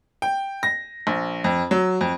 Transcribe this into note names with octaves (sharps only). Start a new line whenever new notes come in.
G5
A#6
A#1
F2
F#3
F2